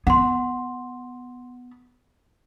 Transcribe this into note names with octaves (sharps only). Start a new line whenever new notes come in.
B3 F#5 C6